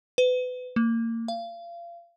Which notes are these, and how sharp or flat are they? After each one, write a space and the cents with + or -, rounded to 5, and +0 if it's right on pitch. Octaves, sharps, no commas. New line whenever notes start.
B4 +30
A#3 -30
F5 -30